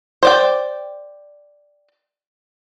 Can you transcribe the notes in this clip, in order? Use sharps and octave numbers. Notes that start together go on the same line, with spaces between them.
C5 D5 G5